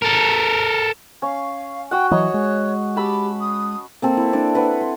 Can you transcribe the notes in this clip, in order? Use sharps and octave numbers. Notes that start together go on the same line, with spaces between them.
A4 A#4
C#4 F5
F#4 F#5 G5
E3 F#3 C#5 D#5
G#3
G4 A5 B5 E6
D#6
A#3 C4 A4
E4
D4 D5
E4 B4 F#5 C#6
C6